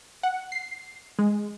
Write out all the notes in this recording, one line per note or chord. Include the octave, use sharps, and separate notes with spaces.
F#5
C7
G#3